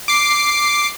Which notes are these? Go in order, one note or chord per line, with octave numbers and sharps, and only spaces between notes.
D6 C7